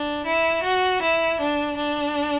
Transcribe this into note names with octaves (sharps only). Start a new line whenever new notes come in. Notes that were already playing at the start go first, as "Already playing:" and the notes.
Already playing: D4
E4
F#4
E4
D4
D4